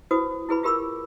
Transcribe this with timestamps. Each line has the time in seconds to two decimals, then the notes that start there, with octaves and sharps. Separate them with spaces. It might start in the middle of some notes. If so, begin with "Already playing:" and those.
0.11 E4 F#4 B4 C5 D#6
0.49 E4 G#4 B4 B5
0.63 F4 G4 A#4 B5 D6 E6